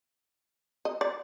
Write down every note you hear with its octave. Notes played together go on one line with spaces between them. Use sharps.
D#5
D5